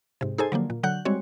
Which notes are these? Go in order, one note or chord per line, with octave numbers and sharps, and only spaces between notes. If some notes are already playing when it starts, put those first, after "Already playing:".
G#2 C3
D#4 G#4 A4 C5 G#5
D3 F3 F#3 A#3
A#2
D3 F#3 F#5 F#6 G6
G3 G#3 C4 F#4 C#5